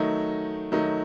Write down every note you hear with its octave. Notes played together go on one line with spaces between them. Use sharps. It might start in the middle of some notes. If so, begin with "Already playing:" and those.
Already playing: D#3 F#3 A3 D#4
D#3 F#3 A3 D#4